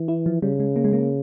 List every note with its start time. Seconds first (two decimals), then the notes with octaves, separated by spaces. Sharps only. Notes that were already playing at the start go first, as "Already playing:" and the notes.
Already playing: E3
0.08 E4
0.26 F3
0.42 C#3 G3
0.60 G#3
0.76 A#3
0.84 G#3
0.93 A#3